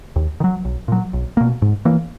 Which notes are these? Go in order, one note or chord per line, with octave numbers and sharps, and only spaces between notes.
D#2
D#3
F#3
B1
A#2 F#3
B1
B2 A#3
G#2
E3 A#3